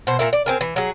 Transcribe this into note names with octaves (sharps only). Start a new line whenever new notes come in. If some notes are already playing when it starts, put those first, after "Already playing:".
B2 C5
A#2 A#4 E5
D5
C4 G#4 A#4
E3
F#3 G#4